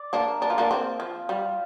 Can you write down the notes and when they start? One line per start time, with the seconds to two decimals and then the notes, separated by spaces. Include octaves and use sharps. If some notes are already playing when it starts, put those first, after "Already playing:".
Already playing: D5
0.13 A#3 D4
0.27 A#4
0.42 D4
0.50 F4
0.58 A#3 D4
0.71 C4 F4
1.00 F3
1.29 G3